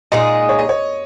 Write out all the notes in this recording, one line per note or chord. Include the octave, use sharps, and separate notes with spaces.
A#2 G#3 D#4 G#4 D#5
C#5
D#5
C#5